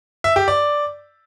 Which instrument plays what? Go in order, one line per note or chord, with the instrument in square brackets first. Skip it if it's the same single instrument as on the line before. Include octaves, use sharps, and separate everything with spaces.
[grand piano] E5
G4
D5